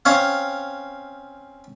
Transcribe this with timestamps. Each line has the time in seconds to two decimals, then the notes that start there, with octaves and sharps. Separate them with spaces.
0.05 C4 C#4 C#5 F5